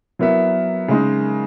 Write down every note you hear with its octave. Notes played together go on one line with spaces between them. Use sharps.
F#3 B3 E4 A#4 E5
C#3 G#3 D#4